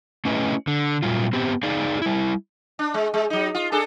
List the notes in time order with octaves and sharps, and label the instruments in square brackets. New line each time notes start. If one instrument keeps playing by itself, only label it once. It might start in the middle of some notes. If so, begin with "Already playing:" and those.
[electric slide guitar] A3 C#4 E4 G#4 B4 D#5
D3
A#2 F#3 G3 F4
B3 C4 G4
D#4 G#4 D5 F5
G3 E4
[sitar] D4
G#3
G#3
F#3 D#4
F4
D4 G#4 A4